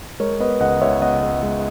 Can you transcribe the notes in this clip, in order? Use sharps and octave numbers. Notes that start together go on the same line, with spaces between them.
G#3 A#4 C#5
B3 B4 D#5
C#2 D#5 F#5
C#2 C#5 E5
B3 D#5 F#5
G#3
G#3